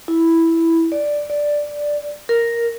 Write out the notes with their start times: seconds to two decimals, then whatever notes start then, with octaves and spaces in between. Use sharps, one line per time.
0.08 E4
0.92 D5
1.30 D5
2.29 A#4